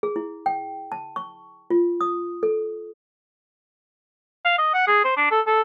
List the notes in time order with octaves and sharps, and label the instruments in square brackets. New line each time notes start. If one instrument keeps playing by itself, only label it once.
[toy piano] G#4
E4
G5
A5
C#6
F4
D#6
A4
[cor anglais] F5
D#5
F#5
G#4
C5
D4
A4
A4